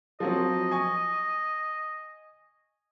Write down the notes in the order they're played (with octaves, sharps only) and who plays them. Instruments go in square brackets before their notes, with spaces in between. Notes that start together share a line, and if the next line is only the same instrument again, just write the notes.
[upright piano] F3 F#3 C4 [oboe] D#5
[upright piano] G#5 C#6